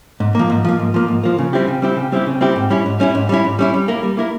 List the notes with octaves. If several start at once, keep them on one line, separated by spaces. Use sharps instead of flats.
G#2
F3 A#3
G#2
F3 A#3
G#2
F3 A#3
G#2
F3 A#3
C#3
G3 C4 E4 G4
C#3
G3 C4 E4 G4
C#3
G3 C4 E4 G4
C#3
G3 C4 E4 G4
G#2
G3 C#4 E4
G#2
G3 C#4 E4
G#2
G3 C#4 E4
G#2
G3 C#4 E4
G3
A#3 E4 A#4
G3
A#3 E4 A#4